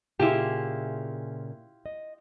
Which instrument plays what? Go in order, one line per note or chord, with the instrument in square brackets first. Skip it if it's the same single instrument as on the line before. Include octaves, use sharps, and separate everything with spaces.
[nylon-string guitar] A#2 C#3 G#4 [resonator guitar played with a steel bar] E4 F4 G4
[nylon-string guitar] D#5